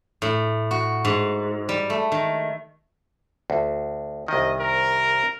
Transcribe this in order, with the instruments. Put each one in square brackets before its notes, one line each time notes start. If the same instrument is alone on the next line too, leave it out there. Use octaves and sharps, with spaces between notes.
[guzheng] A2
F#4
G#2
G3
A3
D#3
[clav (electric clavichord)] D2
[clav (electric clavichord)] C2 D#3 [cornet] D#5
[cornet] A#4